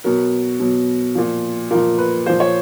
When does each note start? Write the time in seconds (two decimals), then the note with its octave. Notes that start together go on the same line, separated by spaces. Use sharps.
0.04 B2 F#3 A#4
0.60 B2 F#3
1.15 A#2 F3
1.70 A#2 F3 A#4
1.98 B4
2.26 A#2 F3 C5
2.40 C#5